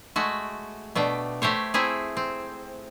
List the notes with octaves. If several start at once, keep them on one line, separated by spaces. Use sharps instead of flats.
G#3 A3 F#4
B2 A3 D4 G5
A3 G4 C5 C#5
A3 C4 E4 G#4
C4